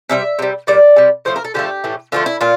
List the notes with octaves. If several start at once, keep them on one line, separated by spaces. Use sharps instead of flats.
C3 G3 E5
C3 G3
A#2 G3 D5
C3 G3
A2 F3 A3 C5
A#4
A4
D3 F3 A3 G4
A2 E3 A3
D3 F3 A3 F4
E4
A#2 F4